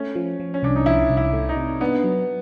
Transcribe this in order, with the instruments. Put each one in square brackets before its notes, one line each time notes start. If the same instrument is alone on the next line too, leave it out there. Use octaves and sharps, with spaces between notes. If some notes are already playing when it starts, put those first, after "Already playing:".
Already playing: [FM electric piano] A3 [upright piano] C#4
[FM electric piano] F3
F3
[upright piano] C#4
[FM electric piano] C2 [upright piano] D4
[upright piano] D#4
[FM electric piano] F3 [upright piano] E4
[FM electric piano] C2
[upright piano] E4
[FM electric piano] A3
[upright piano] D#4
[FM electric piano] C3
[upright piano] B3 [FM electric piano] D4
[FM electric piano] F#3